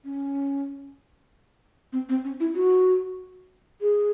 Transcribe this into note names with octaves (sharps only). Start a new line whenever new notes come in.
C#4
C4
C4
C#4
E4
F#4
G#4